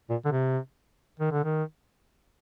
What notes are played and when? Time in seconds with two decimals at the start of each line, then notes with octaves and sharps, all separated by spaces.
0.10 A#2
0.25 D3
0.32 C3
1.20 D#3
1.32 D3
1.44 D#3